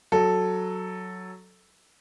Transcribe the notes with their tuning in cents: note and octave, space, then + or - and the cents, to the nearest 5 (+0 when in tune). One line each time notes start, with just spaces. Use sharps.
F#3 +0 A4 +0